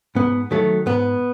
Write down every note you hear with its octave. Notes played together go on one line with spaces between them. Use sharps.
G#2 B3
D#3 F#3 A3
G#2 B3